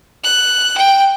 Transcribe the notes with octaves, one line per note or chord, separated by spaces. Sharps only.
F#6
G5